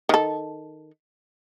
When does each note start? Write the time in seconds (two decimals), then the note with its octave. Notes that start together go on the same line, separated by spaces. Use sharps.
0.09 D#3 A4